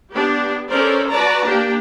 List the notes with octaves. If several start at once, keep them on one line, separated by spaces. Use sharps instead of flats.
B3 D4 G4
C#4 A4 A#4 C5 D5
F#4 B4 D5 A5 A#5
A#3 D4 G4